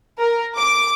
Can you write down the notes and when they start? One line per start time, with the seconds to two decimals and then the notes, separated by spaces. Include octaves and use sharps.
0.19 A#4
0.57 D6